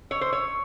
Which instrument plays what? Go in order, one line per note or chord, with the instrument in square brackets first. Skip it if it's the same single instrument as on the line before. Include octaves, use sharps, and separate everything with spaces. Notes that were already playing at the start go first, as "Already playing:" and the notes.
[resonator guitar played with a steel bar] C#5 [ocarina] E6
[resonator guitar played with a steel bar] C5
C#5